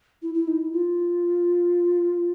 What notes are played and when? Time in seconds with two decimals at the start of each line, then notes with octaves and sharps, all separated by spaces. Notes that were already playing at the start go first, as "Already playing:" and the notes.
0.22 E4
0.34 E4
0.47 D#4
0.59 E4
0.73 F4